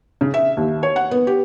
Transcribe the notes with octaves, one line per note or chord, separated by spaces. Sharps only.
C#3
E5
D#2
C#5
F#5
B3
G4